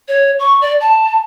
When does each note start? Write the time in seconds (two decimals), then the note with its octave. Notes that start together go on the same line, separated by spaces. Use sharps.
0.08 C#5
0.39 C#6
0.61 D5
0.81 A5